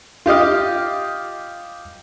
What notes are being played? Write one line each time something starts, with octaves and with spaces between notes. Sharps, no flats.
F4 G4 D#5 F5